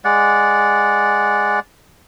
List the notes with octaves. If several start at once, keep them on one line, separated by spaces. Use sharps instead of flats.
G#3 D5 F#5